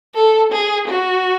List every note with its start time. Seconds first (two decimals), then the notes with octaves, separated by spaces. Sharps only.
0.15 A4
0.52 G#4
0.88 F#4